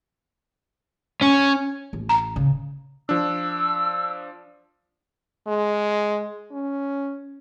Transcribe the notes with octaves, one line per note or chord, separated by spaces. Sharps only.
C#4
A1
A#5
C#3
F3 D4 E6
G#3
C#4